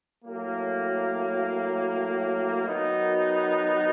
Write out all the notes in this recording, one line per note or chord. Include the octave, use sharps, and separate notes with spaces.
A2 F#3 A#3
D#3 F#3 B3 D#4 F#4